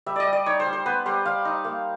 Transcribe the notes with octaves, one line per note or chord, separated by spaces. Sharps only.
G3 E5
D5 D#5
G3
D5
D#4 C#5
C5
G3
C5
B3 B4
G3 C5
G3 F5
D#4
A#3